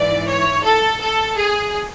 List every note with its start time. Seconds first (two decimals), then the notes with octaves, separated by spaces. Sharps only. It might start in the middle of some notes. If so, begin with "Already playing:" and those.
Already playing: G#2 E3 D5
0.27 C#5
0.63 A4
1.00 A4
1.37 G#4